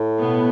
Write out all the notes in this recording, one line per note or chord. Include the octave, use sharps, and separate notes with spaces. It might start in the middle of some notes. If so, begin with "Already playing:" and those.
Already playing: A2
B2 B3